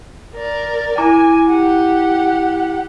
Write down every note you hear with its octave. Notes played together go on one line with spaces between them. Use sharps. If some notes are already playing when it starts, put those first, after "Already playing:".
A#4 D5
E4 G#5 A#5 D6
G4 F#5